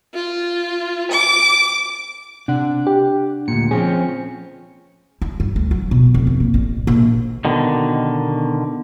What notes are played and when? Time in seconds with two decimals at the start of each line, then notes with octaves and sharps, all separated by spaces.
0.14 F4
1.12 D6
2.48 C3 D4 F#5
2.87 G4
3.48 D2 A#2 C#7
3.71 F3 C4 C#4 G#4
5.22 E4
5.40 G2
5.56 D2
5.71 F#3
5.91 B2
6.14 F1
6.27 F2
6.40 A#3
6.54 A1
6.87 A#1
7.45 B2 D3 D#3